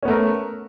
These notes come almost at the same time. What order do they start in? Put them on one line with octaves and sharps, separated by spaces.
C#4 B3 A3 A#4